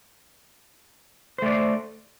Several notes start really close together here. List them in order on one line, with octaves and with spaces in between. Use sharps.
C5 A3 D5